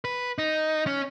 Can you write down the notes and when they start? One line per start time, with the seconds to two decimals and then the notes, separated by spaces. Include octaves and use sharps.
0.05 B4
0.38 D#4
0.87 C#4